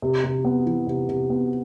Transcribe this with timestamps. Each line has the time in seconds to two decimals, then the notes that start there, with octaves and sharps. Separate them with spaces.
0.02 C3
0.24 C3
0.45 B3
0.66 E3
0.87 C3
1.09 C3
1.30 B3